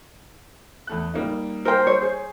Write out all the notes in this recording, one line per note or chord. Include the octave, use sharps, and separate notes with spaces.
E2 A3 F#6
G3 A#3 D#4
A#4 C5 G5
C#5
G#4